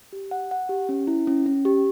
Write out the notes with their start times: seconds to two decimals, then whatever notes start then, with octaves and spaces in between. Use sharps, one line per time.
0.13 G4
0.31 F#5
0.51 F#5
0.69 G4
0.89 C#4
1.07 E4
1.27 C#4
1.46 C#4
1.65 G4